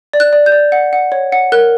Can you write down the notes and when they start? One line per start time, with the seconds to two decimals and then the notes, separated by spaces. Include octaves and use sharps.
0.13 D5
0.20 F#6
0.33 D5
0.46 G6
0.52 D5
0.72 F#5
0.93 F#5
1.12 C#5
1.32 F#5
1.52 A#4 F#6